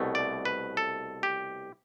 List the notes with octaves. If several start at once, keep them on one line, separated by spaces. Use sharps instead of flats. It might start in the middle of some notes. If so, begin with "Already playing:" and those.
Already playing: C2 B2 A3
D5
B4
A4
G4